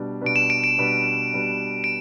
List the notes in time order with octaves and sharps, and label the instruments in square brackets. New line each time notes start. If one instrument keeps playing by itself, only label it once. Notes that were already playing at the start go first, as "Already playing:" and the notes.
Already playing: [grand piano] B2 G3 D4 B4
[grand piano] B2 G3 D4 B4 [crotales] D7
[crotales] E7
D7
D7
[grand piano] B2 G3 D4 B4
B2 G3 D4 B4
[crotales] D7